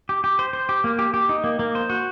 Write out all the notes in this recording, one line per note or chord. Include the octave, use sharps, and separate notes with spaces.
G4
G4
C5
C5
G4
A#3
G4
G4
D#4
A#3
A#3
C5
F#4